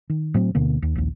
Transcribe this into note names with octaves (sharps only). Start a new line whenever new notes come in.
D#3
A2 F#3 C4
D2 B2 D3 A#3
D#2
A#1 D#2